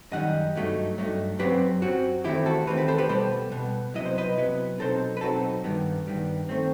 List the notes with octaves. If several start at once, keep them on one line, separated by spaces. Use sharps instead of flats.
F#2 D#3 G3 D#4 D#5 F#5
G2 F#3 A3 D#4
G2 F#3 A3 D#4
F#2 F#3 C4 G4 B4
F#2 F#3 C4 F#4
E2 D#3 F#3 A3 C4 E4 G4
F#4 A4
E2 D#3 F#3 A3 C4 G4 B4
G4 B4
A4 C5
G4 B4
B2 G3 B3 A4 C5
B2 G3 B3
C3 F#3 B3 E4 D#5
C5
B4 D#5
C3 F#3 B3 E4
B2 F#3 C4 D#4 A4 C5
B4
B2 F#3 C4 D#4 F#4 A4
G2 D#3 G3 B3
G2 D#3 G3 B3
D#3 A3 C4